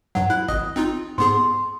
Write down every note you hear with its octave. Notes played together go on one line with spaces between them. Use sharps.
G2 F#3 F#5
E4 F#6
G#1 D#5 D#6
C4 D#4 F4
G#2 B3 G#4 C6